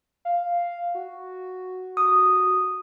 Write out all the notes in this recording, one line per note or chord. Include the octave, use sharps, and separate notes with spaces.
F5
F#4
D#6